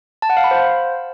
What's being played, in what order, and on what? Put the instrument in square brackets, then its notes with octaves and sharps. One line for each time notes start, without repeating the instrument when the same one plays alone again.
[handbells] A5
F#5
F5
B5
C5